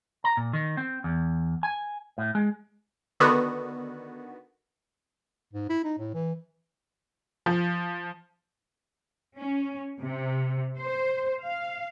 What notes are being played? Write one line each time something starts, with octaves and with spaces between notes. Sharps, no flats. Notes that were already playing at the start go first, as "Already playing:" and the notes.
A#5
A#2
D#3
C4
E2
G#5
A2
G#3
D3 D#3 B3 F#4
G#2
E4
D#4
A2
E3
F3
C#4
C3
C5
F5